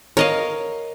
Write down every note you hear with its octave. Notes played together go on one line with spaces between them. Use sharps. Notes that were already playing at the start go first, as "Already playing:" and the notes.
A#4 C#5 D#5 F5